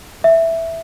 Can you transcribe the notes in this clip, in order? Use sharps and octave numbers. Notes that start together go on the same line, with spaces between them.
E5